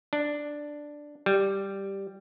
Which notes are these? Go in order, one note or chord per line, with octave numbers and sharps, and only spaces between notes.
D4
G3